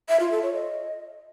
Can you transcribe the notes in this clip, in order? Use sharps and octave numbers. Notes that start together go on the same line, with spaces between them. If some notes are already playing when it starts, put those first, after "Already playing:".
E5
F4
A4
C#5
D#5